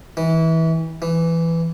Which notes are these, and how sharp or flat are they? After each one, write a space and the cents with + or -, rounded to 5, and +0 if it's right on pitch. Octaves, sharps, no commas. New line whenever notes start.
E3 -25
E3 +10